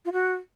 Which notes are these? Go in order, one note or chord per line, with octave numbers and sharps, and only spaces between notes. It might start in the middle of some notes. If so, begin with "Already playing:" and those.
F4
F#4